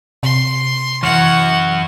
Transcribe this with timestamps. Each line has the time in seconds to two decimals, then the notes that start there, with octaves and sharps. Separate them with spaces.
0.23 C3 C6
1.03 F#2 E3 F#4 F#5 C#6 F6